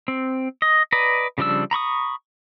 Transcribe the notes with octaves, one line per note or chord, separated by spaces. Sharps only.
C4
D#5
B4 D5 D#5 A#5
C#3 F3 G3 D4 E6
A#5 B5 C#6 D#6